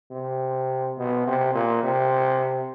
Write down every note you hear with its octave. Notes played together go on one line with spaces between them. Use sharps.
C3
B2
C3
A#2
C3